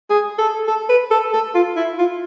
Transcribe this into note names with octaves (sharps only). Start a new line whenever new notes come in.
G#4
A4
A4
B4
A4
A4
F4
E4
F4